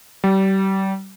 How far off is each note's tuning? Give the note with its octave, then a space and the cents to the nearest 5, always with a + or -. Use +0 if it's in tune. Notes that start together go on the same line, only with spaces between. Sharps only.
G3 -30